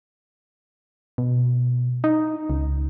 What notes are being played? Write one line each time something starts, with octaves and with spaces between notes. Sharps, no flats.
B2
D#4
C#2